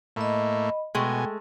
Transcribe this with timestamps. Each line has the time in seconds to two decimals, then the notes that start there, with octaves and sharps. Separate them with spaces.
0.16 A2 A3 A#3 D#5 B5
0.95 B2 G#3 A3 G5 G#5